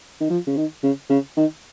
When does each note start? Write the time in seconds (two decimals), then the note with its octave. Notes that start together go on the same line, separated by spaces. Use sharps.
0.21 D#3
0.30 F3
0.47 C#3
0.57 D#3
0.83 C#3
1.10 C#3
1.37 D#3